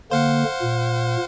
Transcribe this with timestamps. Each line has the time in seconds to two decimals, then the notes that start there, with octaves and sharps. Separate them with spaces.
0.11 D3 A#3 C5 F5 F#5
0.62 A#2